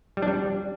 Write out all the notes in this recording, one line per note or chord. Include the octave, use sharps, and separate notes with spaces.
G3
D4
G3